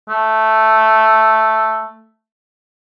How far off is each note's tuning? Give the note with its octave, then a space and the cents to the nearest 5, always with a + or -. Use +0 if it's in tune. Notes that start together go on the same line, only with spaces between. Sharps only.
A3 +0